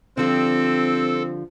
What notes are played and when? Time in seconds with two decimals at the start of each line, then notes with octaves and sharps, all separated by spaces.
0.17 D3 F3 G3 C4 A4